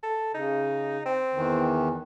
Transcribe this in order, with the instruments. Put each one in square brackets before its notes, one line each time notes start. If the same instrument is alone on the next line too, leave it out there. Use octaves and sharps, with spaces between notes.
[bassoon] A4
[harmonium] C#3 [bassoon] D#4
[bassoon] C4
[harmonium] E2 D#3 E3